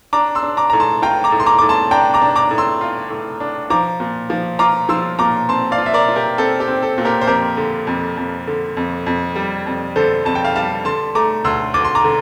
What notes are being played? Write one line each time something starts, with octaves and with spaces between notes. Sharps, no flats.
D4 A#5 D6
C6 E6
D4
A#5 D6
A2 A#5
A5 C6
F4 G5 A#5
A#5 D6
A2
C6
A#5 D6
A2 D6
A5 C6
D4 G5 A#5
A#5 D6
D4
A#5 D6
A2
C6 E6
F4
A2
D4
F3 A#5 D6
A#2
F3
F4 A#5 D6
F3 C6 E6
A#2 A#5 D6
C4 A5 C6
D5 F5
F4
E5
A#4 D5
F4
G4 A#4
C4 A4
G4
C4
A4
A#2
G4 A#4
C5
F2 G4 A#4
D3
F2
F2
D3
F2
F2
G3
F2
D3 A4 C5
F2 A5
G5
F5 A5
G3 F5 A5
D3 A5 C6
A3 A#5 D6
D2 C6 E6
D2 D6
C6
A#5 D6
D3